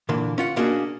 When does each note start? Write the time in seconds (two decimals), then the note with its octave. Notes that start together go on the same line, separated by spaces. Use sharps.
0.09 A#2 D3 E3 A#3
0.38 C#4 F4 F#5
0.56 B2 A#3 C#4 D4 F#4 G#4